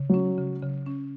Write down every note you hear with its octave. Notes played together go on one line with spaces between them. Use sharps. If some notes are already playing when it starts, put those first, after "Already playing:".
Already playing: C#3
F#3 C#4
C#3
C#3
C#4